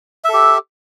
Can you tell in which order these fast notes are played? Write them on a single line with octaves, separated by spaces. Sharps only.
E5 A4 G4